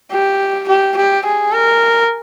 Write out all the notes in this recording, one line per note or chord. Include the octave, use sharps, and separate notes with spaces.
G4
G4
G4
G#4
A#4